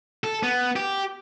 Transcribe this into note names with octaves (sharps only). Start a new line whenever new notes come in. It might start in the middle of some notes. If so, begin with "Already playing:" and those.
A4
B3
G4